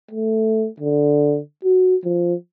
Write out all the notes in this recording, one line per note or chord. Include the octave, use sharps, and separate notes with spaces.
A3
D3
F#4
F3